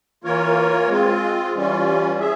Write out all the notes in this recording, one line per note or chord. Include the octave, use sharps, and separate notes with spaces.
E3 A#3 F4 A#4 C#5
G#3 C4 F4
E3 G3 C#4 F4
G#4 E5